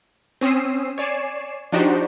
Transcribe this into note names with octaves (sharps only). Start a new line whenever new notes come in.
C4 C#4 D#6 E6 C7
C#5 D5 G#5 C7 E7
F3 D4 D#4 F#4 G4 C5